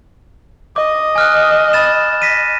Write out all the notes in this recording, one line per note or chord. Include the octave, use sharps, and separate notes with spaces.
D#5 D6
G#5 F6 F#6
B5 A6 E7
A#6 B6 D#7